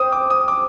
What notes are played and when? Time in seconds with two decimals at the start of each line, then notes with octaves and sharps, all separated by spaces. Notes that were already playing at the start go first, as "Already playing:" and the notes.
Already playing: C4 D#6
0.12 D6
0.30 D#6
0.48 D6